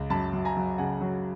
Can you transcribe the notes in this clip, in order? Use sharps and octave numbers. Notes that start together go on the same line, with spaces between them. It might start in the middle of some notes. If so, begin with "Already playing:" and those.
Already playing: C#2
F#2 A5 B5
F#2
G#5 A#5
F#3
C#3 F#5 G#5
F#3